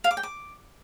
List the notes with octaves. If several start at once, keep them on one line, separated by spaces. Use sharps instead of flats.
F5
D6
G5
D6